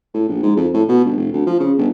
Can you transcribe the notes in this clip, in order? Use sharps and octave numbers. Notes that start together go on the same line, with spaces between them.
A2
A#1
G#2
F2
A2
B2
G1
F1
D2
F3
C#3
G1